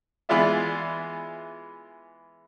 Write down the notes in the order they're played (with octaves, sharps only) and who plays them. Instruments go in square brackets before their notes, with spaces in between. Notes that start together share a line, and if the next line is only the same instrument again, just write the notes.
[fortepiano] E3 G#3 B3 F4 D5 E5